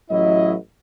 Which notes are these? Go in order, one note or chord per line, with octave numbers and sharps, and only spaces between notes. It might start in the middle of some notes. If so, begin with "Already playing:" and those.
A1 F#3 E4 D#5